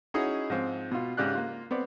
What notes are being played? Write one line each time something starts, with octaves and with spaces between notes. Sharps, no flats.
C#4 D#4 E4 F#4 G#4 D#5
G#2 F3 C4
B2 F4
G#2 C#3 G4 D5 F6 F#6
A#3 F4
B3 C4 D5